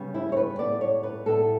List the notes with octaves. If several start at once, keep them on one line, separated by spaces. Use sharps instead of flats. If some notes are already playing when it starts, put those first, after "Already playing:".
Already playing: C#3 G3 B3
E4
C#5
B4
A2 G3 B3 D5
C#5
B4
A2 G3 B3 A4